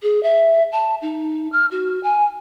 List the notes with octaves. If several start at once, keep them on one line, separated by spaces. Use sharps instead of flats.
G#4
E5
A5
D#4
F6
F#4
G#5